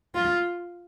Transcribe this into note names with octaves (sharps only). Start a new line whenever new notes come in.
F4